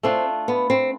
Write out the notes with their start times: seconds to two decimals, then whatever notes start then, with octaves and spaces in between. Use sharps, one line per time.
0.03 A3 C4 D4 F4
0.48 B3
0.70 C4